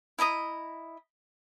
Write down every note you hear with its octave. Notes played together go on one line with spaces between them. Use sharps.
E4 D#5 A#5 D#6